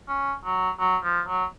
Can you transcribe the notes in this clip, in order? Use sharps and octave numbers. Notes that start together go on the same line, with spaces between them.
C#4
F#3
F#3
F3
F#3